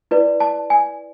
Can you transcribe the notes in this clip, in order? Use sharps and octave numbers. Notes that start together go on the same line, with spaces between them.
E4 B4 D5
A5
G#5